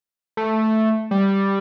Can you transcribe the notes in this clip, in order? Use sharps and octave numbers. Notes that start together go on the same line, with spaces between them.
A3
G3